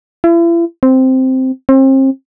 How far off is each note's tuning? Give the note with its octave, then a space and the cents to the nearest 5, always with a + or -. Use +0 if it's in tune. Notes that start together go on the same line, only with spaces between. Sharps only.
E4 +40
C4 -5
C4 +35